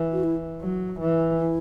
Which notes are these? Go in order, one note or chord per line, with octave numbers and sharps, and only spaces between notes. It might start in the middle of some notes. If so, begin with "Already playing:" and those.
Already playing: E3
F#4
E4
F#3
E3
E4